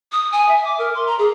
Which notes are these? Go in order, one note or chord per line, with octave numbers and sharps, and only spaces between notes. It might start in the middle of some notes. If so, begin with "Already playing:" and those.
D#6
G#5
E5
D6
A#4
C6
A#5
G#4